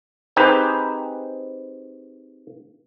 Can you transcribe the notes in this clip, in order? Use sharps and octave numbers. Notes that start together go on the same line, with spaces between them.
C4 D#4 G4 G#4 B4 C5